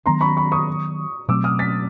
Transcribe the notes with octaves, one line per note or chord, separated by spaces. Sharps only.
D#3 F#3 B3 D4 A#5 C6
B5 C#6
B5 C#6
C#6 D#6
B2 F#3 A3 C4 D6 E6
D#6 F6
A6 B6